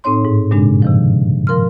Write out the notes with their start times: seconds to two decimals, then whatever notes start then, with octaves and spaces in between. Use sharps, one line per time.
0.04 A2 C4 D#4 C#5 C6
0.25 G#2
0.51 G2 A#2 C#3 G#3 D4
0.82 C3 D#3 F3
1.47 F3 A#4 C6 F6